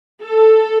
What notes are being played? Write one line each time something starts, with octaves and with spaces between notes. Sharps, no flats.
A4